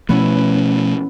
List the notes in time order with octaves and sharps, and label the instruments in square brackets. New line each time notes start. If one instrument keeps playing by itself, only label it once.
[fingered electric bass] B2 F3 A3 [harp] B3 C#4 E4